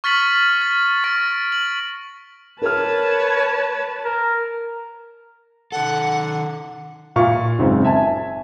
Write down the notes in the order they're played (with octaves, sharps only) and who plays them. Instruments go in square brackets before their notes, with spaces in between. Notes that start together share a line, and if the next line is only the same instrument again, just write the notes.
[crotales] C#6 F6 A6 B6 C#7 F#7
A6
C#6 A6 A#6 D7
F#7
[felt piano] A#4 F6 [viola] B4 A5 [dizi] C#5
[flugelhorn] A#4
[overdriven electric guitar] D#3 A4 [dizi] F#5
[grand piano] A#2 F5 C#6
F#1 G#2 C#3 C4
E5 G#5 A5